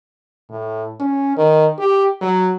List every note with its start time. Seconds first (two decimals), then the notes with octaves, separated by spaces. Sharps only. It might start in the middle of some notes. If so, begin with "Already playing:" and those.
0.50 A2
1.00 C#4
1.37 D#3
1.78 G4
2.21 F#3